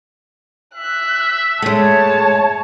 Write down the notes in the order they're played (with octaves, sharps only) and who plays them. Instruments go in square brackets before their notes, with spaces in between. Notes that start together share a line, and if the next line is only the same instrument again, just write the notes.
[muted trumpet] E5 [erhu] F#6
[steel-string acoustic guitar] G#3 A3 [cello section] C#5 [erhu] A5